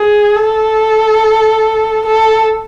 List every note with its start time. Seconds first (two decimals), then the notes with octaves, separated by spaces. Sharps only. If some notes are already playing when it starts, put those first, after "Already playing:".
Already playing: G#4
0.36 A4
2.06 A4